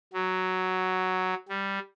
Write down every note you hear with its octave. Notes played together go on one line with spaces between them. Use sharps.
F#3
G3